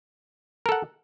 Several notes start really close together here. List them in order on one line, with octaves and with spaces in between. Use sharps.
A#4 A4 F#5